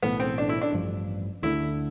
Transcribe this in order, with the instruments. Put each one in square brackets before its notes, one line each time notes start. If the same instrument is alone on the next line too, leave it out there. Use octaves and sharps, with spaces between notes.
[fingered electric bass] B1 A2 E3 A3 [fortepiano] B3
[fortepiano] C4
D4
E4
D4
[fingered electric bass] A1 G2 F3
[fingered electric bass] D2 D3 F3 A3 [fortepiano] E4